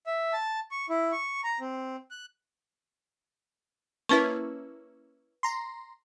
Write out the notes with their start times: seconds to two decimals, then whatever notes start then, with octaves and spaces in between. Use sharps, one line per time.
0.06 E5
0.33 A5
0.71 C#6
0.89 E4
1.12 C#6
1.44 A#5
1.60 C4
2.11 F#6
4.09 A#3 C#4 E4 B4 A5 C#6
5.43 A#5 C6